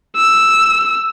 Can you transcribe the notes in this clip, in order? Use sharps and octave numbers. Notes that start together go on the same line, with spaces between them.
E6